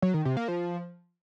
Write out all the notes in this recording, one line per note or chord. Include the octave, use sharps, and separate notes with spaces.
F#3
D#3
C3
A#3
F3